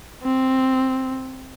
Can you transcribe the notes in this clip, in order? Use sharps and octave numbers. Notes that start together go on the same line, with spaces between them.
C4